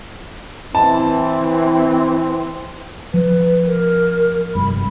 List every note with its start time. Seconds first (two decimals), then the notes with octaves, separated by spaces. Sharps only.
0.75 E3 C4 A5
3.14 F3 B4
3.67 A#4
4.55 F1 G2 B5